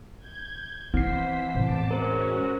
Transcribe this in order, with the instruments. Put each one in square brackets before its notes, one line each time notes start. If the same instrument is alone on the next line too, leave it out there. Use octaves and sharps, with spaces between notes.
[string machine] G6 G#6
[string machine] E3 C5 B6 [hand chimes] C4 C7 [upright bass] E4
[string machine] E2 A5 D6 [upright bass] A2 E3
[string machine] G#3 C#4 F#4 [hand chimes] A#4 C5